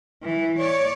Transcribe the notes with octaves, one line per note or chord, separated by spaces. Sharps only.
E3
C#5 D5